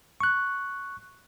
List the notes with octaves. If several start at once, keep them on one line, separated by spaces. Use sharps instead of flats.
C#6 F#6